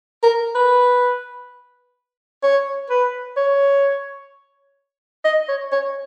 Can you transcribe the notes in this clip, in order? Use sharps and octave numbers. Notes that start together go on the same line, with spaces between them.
A#4
B4
C#5
B4
C#5
D#5
C#5
C#5